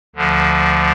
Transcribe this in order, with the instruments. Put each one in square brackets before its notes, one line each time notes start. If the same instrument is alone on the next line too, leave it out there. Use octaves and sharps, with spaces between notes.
[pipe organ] D2 D3 F3